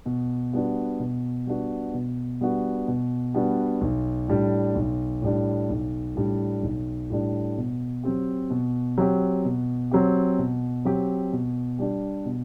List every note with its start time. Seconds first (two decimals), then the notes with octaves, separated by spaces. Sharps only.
0.06 B2
0.53 G3 B3 D4 F#4
0.99 B2
1.46 G3 B3 D4 F#4
1.94 B2
2.41 G3 B3 D4 F#4
2.88 B2
3.34 G3 B3 D4 F#4
3.81 B1
4.28 A2 G3 D4
4.75 B1
5.22 A2 G3 D4
5.69 B1
6.15 A2 G3 D4
6.63 B1
7.10 A2 G3 D4
7.57 B2
8.03 F#3 C4 G4
8.50 B2
8.98 F#3 C4 G4
9.45 B2
9.91 F#3 C4 G4
10.38 B2
10.85 F#3 C4 G4
11.33 B2
11.79 G3 D4 G4
12.25 B2